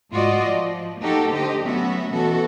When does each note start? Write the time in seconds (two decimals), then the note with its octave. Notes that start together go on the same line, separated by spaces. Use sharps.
0.12 G#2 F4 F#4 D5 D#5
0.46 F3
1.00 A#3 D#4 F#4 G4 A4
1.32 D3 G4 C5 D#5
1.62 F#3 A3 B3 C#4 F#4 E5
2.13 B2 E3 F#4 A4